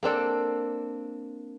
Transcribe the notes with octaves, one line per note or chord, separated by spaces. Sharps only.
A#3 C4 D4 A4